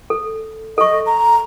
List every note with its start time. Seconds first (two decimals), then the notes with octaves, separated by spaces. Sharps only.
0.10 A4
0.78 A4 D#5 C#6
1.06 A#5